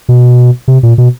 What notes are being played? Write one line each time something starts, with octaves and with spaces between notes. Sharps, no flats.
B2
C3
A#2
B2